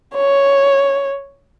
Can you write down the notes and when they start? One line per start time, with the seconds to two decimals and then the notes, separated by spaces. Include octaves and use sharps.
0.14 C#5